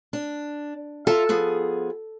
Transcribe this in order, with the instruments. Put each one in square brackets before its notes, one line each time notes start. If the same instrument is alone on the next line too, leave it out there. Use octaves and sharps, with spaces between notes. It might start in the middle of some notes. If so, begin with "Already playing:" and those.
[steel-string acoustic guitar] D4
[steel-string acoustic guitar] F4 E5 A#5 [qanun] A4
[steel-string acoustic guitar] F3 B3 G#4